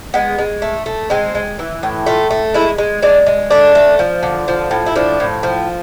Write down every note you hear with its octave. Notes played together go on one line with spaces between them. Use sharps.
G#3 B3
G#3
A3
A3
G#3 C4
G#3
E3
A2
A3 F4
A3
G#3 E4
G#3
G#3 D4
G#3
A3 D4
A3
F3
D3
F3
A2
E4
F3 D4
A2
F3